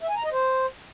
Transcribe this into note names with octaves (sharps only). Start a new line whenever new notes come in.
E5
G#5
A#5
D#5
C5